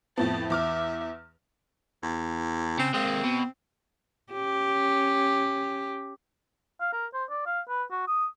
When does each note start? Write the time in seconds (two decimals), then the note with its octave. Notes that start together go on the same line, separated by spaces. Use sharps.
0.18 F2 A2 B3 A5
0.50 E2 E5 D6 F6
2.03 E2
2.79 C#3 C4
2.94 G#3 A#3 C4
3.24 B2
4.33 C#4 G4
6.80 F5
6.93 A#4
7.14 C5
7.30 D5
7.46 F5
7.69 B4
7.91 F#4
8.07 D#6